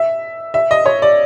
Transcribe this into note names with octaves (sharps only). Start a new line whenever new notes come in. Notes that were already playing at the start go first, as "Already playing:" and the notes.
Already playing: E5
E5
D#5
C#5
D5